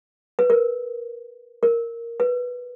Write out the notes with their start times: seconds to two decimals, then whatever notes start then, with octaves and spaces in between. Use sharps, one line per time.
0.39 B4
0.50 A#4
1.63 A#4
2.20 B4